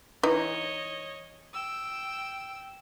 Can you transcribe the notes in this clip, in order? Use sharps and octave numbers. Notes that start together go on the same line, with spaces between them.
E3 D#4 C#5 D#5
G5 E6